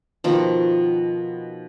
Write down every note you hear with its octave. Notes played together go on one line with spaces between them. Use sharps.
B2 D#3 F3